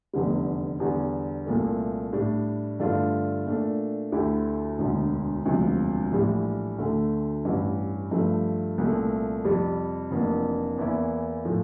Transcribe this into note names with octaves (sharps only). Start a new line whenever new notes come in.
F1 E2 D3 G3
E2 D3 G3
C2 A#2 A3
A2 G3 D4
G2 D3 A3 D4 F4
A#2 A3 D4
D2 D3 A3 E4 G4
E1 D2 D3
E1 D2 C3 F3
A#1 A2 E3 G3
D2 D3 A3
A1 G2 E3
G2 F3 A3
C2 A#2 A3
F2 C3 G3
F1 F2 E3 A#3 D4
E2 E3 A#3 E4
A2 F3 A3